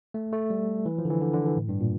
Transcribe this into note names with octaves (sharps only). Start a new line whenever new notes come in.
A3
A3
G3
E3
F3
D3
E3
D3
D3
E3
A2
G2
A#2